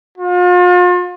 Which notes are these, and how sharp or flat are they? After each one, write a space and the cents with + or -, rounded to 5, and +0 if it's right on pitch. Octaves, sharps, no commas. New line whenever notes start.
F4 +40